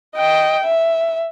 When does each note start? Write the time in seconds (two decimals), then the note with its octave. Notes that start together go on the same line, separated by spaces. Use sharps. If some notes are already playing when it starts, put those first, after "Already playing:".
0.16 D#5 G5
0.64 E5